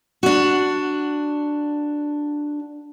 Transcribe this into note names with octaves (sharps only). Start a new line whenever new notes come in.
D4 F#4